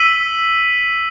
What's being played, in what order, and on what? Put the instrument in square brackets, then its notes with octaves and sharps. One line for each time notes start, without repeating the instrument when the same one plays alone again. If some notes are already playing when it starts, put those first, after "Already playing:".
Already playing: [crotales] E6 B6 D#7 F#7